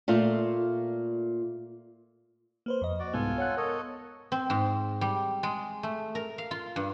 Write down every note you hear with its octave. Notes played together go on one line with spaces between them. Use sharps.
A#2 A3 F4
A#3 B4 C5
F2 D#5
F#4 D5
C2 G#2 G#3 B3 F4 A4 G#5
C#5 F#5 F#6
A4 A#4 C#5 D#5
C4
G#2
G3
G#3
A3
A#4
F5
F4
G2